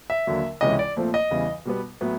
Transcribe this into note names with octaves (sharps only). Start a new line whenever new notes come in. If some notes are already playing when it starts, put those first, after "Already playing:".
E5
D#2 D3 F#3
C#2 C3 E3 G#3 C#4 D#5
D5
A#2 F3 A3 C4
D#5
E2 C#3 E3 G3
B2 G3 B3
A2 F#3 B3